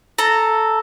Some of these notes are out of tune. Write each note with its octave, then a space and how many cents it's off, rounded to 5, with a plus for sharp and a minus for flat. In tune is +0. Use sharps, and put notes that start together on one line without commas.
A4 +0 A#5 -15